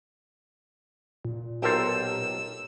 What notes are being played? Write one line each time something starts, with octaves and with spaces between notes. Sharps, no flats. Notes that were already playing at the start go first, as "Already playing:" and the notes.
A#2
B1 G4 A4 A#4 C5 E6